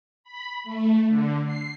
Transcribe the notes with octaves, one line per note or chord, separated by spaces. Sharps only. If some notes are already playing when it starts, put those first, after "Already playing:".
B5
A3
D3
C7